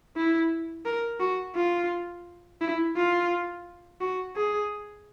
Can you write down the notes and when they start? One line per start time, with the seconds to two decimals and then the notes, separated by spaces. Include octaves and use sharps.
0.16 E4
0.86 A#4
1.20 F#4
1.55 F4
2.61 E4
2.96 F4
4.01 F#4
4.36 G#4